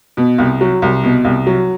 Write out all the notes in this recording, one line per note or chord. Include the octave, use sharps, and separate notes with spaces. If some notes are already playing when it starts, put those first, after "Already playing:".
B2
C2
F#3
C2
B2
C2
F#3